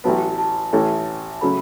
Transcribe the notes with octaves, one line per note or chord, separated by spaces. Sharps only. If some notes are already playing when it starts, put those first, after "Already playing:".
A1 A2 F#3 B3 A5
A5
A1 A2 E3 A3 C#4
C#3 F#3 A3 B5